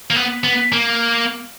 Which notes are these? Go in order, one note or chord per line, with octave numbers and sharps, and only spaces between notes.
A#3
B3
B3
A#3